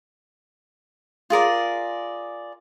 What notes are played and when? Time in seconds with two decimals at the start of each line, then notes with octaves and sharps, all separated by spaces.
1.30 F4 G#4 A#4 D5